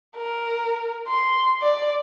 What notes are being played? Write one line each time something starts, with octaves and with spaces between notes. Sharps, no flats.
A#4
C6
D5